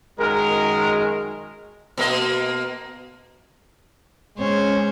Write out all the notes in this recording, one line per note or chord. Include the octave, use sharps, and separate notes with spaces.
F#2 D#3 G#3 A#4
B2 A#3 D#5
G#3 C#4 C5 C#5